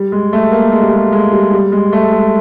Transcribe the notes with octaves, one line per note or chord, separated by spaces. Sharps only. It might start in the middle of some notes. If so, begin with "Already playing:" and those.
Already playing: G3
G#3
A3
A#3
G#3
G3
G#3
G#3
G3
G3
G#3
A3
G#3